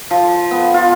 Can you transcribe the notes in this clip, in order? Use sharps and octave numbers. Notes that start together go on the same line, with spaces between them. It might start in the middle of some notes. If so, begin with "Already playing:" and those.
F3
B3
F4